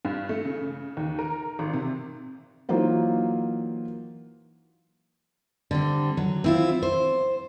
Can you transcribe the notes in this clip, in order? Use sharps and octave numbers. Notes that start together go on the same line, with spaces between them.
G2
A3
C#3
D#2
A#4
G#1
C3
E3 F#3 A#3 D#4 F4 C5
D3 G3 C4
F#3
C4 E4 F4
C5